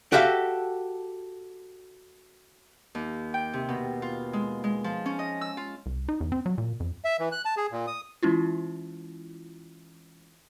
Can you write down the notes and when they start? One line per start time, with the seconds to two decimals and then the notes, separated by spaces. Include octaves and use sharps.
0.12 F#4 G4 A4 E5 F5
2.95 D#2
3.34 G5
3.53 C3
3.69 B2
4.02 F4
4.33 G#3
4.64 G#3
4.84 F3
5.06 C#4
5.19 D#5
5.41 E6
5.57 F4
5.86 C2
6.09 D#4
6.21 E2
6.32 C4
6.46 F#3
6.58 A#2
6.80 F2
7.05 E5
7.20 E3
7.32 F#6
7.45 A5
7.57 G#4
7.72 A#2
7.87 D#6
8.23 E3 G#3 C#4 E4 F4